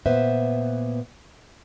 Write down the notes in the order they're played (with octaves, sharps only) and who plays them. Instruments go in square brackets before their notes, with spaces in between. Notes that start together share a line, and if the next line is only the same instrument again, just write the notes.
[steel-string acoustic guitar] A#2 B3 B4 C5 E5